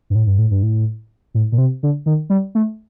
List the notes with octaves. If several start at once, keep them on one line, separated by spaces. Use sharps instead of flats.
G2
A2
G2
A2
G2
A2
A2
A#2
C3
D3
D#3
G3
A3